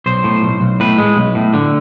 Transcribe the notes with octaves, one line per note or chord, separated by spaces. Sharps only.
B1 C5
A2
B1
B1
A2 B4
G#3
B1
A2
D3